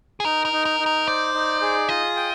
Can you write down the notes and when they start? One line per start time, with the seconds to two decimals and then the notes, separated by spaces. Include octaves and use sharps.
0.20 G#4
0.25 D#4 A#4
0.45 A#4
0.52 D#4
0.65 A#4
0.80 D#4
0.86 A#4
1.07 C5 D5
1.34 D#4
1.62 G#4
1.89 F4 D#5
2.16 G5